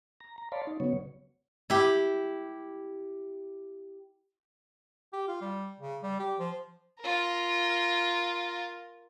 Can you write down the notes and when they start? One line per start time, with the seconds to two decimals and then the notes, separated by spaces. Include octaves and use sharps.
0.20 A#5
0.38 A#5
0.52 C#5 D5 F5 A5 B5 C6
0.67 D#4
0.80 C#3 F#3 B3 C#5
1.70 E4 G4
5.13 G4
5.28 F4
5.41 G3
5.80 C#3
6.02 G3
6.20 G4
6.39 F3
7.00 F4 A#4